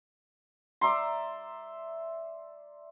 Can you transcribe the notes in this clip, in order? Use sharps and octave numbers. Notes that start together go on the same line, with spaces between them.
D5 E5 A#5 C6